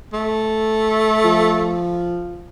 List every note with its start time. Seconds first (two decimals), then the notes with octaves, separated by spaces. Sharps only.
0.13 A3
1.24 F3